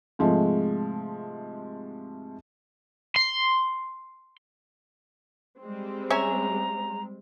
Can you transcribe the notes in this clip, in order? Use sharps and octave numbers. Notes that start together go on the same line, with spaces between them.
G#2 C3 F3 G#3 A3
C6
G3 G#3 C4
C#4 E5 G#5 A#5